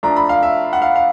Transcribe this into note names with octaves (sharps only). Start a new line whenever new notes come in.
F3 A3 D4 A#5
B5
F5
E5
F#5
F5
F5